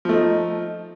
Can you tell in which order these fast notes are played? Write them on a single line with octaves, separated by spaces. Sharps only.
F3 A3 D#4